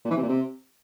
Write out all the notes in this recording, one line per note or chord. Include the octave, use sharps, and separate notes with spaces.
A#2
E3
C3
A#2
C3